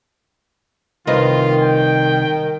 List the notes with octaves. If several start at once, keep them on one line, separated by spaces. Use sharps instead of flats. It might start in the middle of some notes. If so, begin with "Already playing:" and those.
C2 D#3 F4 B4 D#5
G5